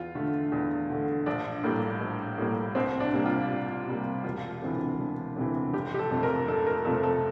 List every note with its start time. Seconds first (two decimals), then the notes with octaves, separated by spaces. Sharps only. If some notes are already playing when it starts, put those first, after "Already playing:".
Already playing: E2 F4
0.15 D3 A3
0.52 E2
0.90 D3 A3
1.26 A#1 D4
1.64 A2 G3 A#3
2.00 A#1
2.38 A2 G3 A#3
2.75 C2 C4
3.00 D4
3.13 C3 G3 A#3
3.26 F4
3.50 C2
3.87 C3 G3 A#3
4.24 E1 F4
4.62 D2 C3 E3
5.00 E1
5.36 D2 C3 E3
5.73 F1 G4
5.94 G4
5.99 A4
6.11 F2 C3 F3 A3
6.23 A#4
6.48 F1 A4
6.67 A#4
6.85 F2 C3 F3 A3 A4
7.03 A4